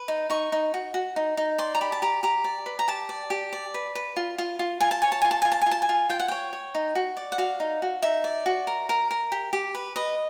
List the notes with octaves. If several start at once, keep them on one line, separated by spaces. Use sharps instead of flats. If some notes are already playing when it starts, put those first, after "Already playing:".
Already playing: B4
D#4
D#4 C#6
D#4
F#4
F#4
D#4
D#4
D5 C6
A#5
G4 B5
A5
G4 A#5
G4 A#5
D5
B4
A#5
G4 A5
D5
G4
D5
B4
B4
F4
F4
F4
F4 G#5
A5
C#5 G#5
A5
F4 G#5
A5
F4 G#5
A5
G#5
F4
A5
G#5
F4
F4 G5
F#5
C#5 G5
C#5
D#4
F#4
D5
F#5
F#4 F5
D#4
F#4
D#4 E5
D5
F#4
A#4
A#4
A#4
G4
G4
B4
B4 D#5